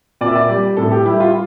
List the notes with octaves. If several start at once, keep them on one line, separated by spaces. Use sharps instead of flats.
A#2 D5
E5
D5
G3
A2 A4
G4
G3 E4
F4